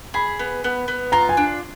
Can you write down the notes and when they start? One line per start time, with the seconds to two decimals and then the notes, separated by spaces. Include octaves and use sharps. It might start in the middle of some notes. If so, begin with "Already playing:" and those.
0.14 G#4 B5
0.39 B3
0.64 B3
0.88 B3
1.12 F4 A#5
1.29 G#5
1.37 D4